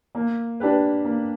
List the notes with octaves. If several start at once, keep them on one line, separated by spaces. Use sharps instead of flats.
A#3
D4 G4 B4
A#3